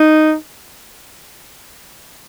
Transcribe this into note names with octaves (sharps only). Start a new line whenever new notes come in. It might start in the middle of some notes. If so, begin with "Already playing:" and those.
Already playing: D#4